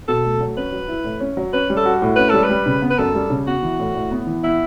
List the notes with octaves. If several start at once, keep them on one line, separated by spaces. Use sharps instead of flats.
B2 A4
A3
F#3
C#4 B4
F#3
E4
A2
C#4
F#3
C#4 B4
G3
A4
F#4
A2
C#4 B4
G3 A4
B4
G3
C#3
B3
B4
F#2 A4
G3
C#3
B3 F#4
E3
A2
A2
B3
E3
B3 E4